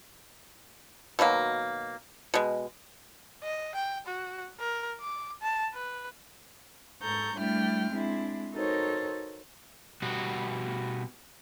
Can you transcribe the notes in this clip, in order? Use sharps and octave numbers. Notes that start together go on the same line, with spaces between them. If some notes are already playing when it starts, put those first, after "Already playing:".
B2 D#3 F#3 A#3
B2 G#3
D#5
G5
F#4
A#4
D6
A5
B4
G#2 A4 A#5 C#6 G6
G3 A3 D4 E4 G5 F6
G#3 C4 D4 E4
D#4 F#4 A4 A#4 C5 C#5
B2 G3 B3 F#4